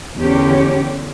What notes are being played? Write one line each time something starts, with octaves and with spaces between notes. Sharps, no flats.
E2 D3 C#4 G4